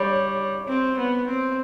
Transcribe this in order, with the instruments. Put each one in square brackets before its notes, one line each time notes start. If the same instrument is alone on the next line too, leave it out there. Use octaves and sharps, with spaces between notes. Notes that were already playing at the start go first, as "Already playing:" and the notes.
Already playing: [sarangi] G3 [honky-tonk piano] C#5
[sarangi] C4
B3
C4